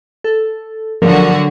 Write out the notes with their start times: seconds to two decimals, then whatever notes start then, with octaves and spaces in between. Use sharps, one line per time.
0.24 A4
1.02 D3 F3 F#3 F#4 A#4